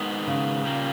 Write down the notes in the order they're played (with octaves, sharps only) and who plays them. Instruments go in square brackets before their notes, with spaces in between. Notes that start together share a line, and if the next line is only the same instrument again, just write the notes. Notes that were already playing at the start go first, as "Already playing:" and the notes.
Already playing: [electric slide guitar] G#2 D#3 G#3 B3
[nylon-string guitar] C#3
[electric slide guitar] A#2 G3 A#3